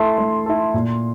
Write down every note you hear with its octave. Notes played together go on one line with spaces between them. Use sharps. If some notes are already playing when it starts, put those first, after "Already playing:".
Already playing: A3 E4 A4 C6
A3
E4 A4
A#2